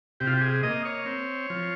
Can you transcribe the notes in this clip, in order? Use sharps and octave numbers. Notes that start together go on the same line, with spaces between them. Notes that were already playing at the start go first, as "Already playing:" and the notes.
C3 G4
F4
G4
G#4
A#3 D#5
C#5
C4
F3